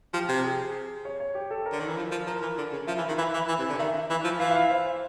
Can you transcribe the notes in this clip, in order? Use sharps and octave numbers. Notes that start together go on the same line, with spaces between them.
F3 G4
C3 G4
G#4
C#5
C#5
G4
A4
A#4
D3
D#3
E3
F3
F3
F3 A#4
E3
D3
C#3
F3 E5
E3
D#3
E3 E5
E3
E3
C3
D3
D#3 E5
E3
F3
E3 F5
E5
F5
C5
C5